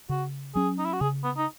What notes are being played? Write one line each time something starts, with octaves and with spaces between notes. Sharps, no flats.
C#3 F#4
F#3 C#4 G#4
D#4
E4
F#4
C#3 G#4
B3
D#4